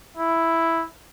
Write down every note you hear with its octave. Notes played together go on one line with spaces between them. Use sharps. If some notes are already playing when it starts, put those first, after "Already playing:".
E4